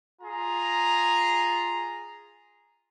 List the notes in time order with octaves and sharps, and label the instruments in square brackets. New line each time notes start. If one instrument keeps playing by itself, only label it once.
[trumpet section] F4 G#4 A#5